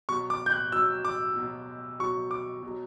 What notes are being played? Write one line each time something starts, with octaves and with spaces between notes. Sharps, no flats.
B2 F#3 C#6
D6
G6
F#6
B2 F#3 E6
D6
B2 F#3
B2 F#3 C#6
D6
B2 F#3